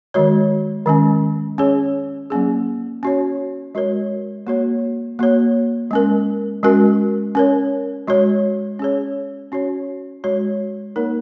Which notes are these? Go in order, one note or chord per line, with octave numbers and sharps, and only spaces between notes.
D#3 G#3 F#4 C#5
D#3 G#3 C#4
C#4 G#4 C#5
F#3 A#3 C#4 G#4
C#4 F#4 C#5
G#3 F#4 A#4 C#5
A#3 F#4 C#5
A#3 F#4 C#5
G#3 C#4 A#4
G#3 C#4 F#4 A#4
C#4 A#4 C#5
G#3 F#4 C#5
C#4 G#4 C#5
C#4 F#4 C#5
G#3 F#4 C#5
A#3 D#4 A#4 C#5